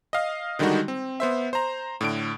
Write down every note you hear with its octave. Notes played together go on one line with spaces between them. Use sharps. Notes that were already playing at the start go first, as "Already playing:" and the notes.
D#5 F5 D#6
D3 D#3 G3 G#3 D#4 F#4
C4
B3 C5 E5
C5 A#5
A2 D3 D7